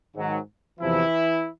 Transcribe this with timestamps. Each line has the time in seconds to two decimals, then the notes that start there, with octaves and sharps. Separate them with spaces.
0.15 G#2 D#3 F#3
0.79 E2 C3 E3 F3 E4